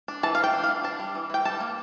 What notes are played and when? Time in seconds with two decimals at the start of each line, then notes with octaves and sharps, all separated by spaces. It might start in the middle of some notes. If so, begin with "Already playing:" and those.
0.08 D4
0.23 E3 A5
0.35 F5
0.38 E3
0.44 G5
0.54 D4
0.64 F5
0.68 E3
0.84 D4 A5
1.00 G3
1.15 E3
1.30 E3 G5
1.45 G3 A5
1.60 A#3